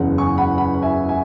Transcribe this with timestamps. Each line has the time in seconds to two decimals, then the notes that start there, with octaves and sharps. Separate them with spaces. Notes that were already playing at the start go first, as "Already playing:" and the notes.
Already playing: F#1 E2 C#3 F#5
0.18 G#5 C#6
0.38 F#5 B5
0.58 F#5 B5
0.74 B5
0.82 E5 G#5
1.09 E5 G#5